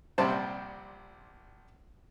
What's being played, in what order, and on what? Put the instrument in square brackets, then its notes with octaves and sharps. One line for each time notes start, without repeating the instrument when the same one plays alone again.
[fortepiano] A#1 C3 G3 C4 C5 A5